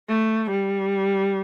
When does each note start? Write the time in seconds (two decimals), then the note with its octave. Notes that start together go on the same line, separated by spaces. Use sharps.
0.08 A3
0.50 G3